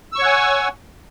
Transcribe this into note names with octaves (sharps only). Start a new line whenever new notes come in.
C#5 F#5 G#5 C#6 E6